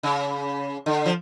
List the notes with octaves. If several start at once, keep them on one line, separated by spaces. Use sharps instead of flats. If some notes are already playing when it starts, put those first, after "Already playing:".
C#3
D3
F3